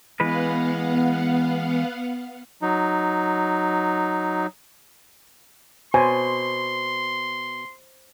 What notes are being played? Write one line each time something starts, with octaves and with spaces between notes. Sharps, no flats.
E3 G#3 B3 B4 F5 F#5
F#3 D#4
B2 C5 G#5 C6